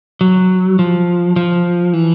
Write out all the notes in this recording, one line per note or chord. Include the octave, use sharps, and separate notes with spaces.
F#3
F3
F3
E3